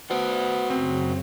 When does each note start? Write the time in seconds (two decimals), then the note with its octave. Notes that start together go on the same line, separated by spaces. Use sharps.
0.10 B3 F#4 C5
0.70 F#2 C#3 C4